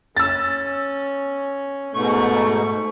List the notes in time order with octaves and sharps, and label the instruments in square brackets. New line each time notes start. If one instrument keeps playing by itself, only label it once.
[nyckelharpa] C#4 [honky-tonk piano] E6 A6
[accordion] G#2 B2 [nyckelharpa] A3 C#6